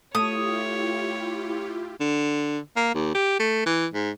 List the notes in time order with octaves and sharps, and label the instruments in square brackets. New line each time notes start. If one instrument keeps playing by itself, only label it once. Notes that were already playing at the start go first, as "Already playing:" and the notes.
[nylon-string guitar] A3 [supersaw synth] E4 F4 G4 [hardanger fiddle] C#5 [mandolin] D#6
[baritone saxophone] D3
A#3
D#2
G4
A3
E3
G#2